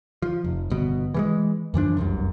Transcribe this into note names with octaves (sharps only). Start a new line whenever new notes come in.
F3
F1
G1 B2
E3 G3 G#3
F#2 E3 F3 D4
F1 C2 F#2